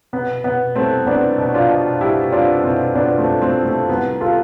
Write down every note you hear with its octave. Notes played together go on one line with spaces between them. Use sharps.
B2 B3
B2 B3
C2 A3 C4
C2 B3 D4
B2
D4 F4
B2
C2 E4 G4
C2 D4 F4
B2 C4 E4
B2 B3 D4
A3 C4
C2
A3 C4
C2
A3
C2 B3
C3 F4 A4